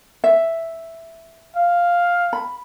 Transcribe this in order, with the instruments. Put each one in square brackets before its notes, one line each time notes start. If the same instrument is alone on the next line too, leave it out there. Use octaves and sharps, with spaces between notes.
[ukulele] E5
[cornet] F5
[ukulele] B5